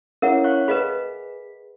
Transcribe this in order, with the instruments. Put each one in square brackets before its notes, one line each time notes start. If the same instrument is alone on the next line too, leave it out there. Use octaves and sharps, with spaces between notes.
[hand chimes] C#4 E4 C#5 [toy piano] A#4 E5 F#5
[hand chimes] F5 C#6 F#6
[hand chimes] G#4 B6 [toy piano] B4 D#5 B5